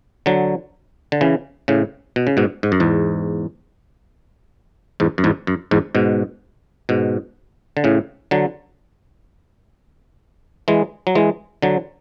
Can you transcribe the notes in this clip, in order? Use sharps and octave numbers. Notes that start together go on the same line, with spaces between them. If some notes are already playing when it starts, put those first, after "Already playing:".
D3 F#3
D3
C#3 E3
A2 C#3
B2
C#3
G#2 B2
G#2
F#2
E2 G#2
E2 G#2
F#2
E2 G#2
F#2
E2 G#2
G#2 B2
G#2 B2
D3
A2 C#3
D3 F#3
E3 G#3
F#3
E3 G#3
D3 F#3